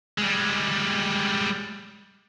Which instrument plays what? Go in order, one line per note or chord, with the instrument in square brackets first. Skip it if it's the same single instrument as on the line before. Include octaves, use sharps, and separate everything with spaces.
[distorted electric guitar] G3 G#3